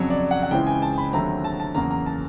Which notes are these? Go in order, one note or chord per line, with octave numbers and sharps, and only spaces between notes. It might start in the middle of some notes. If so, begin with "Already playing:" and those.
Already playing: F2 C#3 F#3 C#5
D5
F#5
F#5
C#2 C#3 E3 G#3 C4 G5
G#5
A5
B5
D#2 D3 F#3 A3 C4 A#5
A5
A5
E2 C#3 F#3 A#3 A#5
A#5
A5